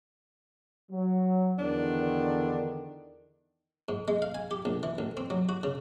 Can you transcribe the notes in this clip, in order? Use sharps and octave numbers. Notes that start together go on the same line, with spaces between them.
F#3
E2 D3 D#3 D4
G#2
G#3
F5
G#5
G4
A#1
E3
A1
C4
F#3
F#4
C#3